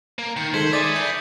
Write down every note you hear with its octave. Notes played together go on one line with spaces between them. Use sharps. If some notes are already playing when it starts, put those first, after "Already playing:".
A#3
D#3 C#7
D#3 G#3 A4 C5 G#6 B6 F#7
D5 E5 G#5 D#6 A6
G6 A6 B6